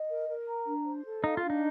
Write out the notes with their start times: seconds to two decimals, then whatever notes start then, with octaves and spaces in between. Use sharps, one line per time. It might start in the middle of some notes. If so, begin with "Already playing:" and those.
Already playing: D#5
0.09 A#4
0.28 A#4
0.47 A#5
0.66 D4
0.86 C5
1.05 A4
1.23 D#4 F5
1.37 F4
1.44 D4
1.50 D#4